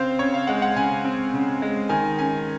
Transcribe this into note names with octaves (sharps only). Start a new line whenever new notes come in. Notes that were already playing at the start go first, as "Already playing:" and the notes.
Already playing: C#3 C4 C5 F5
C#3 C#5
F5
G#3 F#5
F#5
C#3 G#5
C4
C#3
G#3
D#3 G#5
C#4 G#5